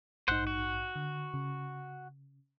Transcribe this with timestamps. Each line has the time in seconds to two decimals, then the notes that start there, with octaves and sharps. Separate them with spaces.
0.28 A#1 G#2 D#4 C5 F#5
0.47 F#4
0.95 D3
1.34 C#3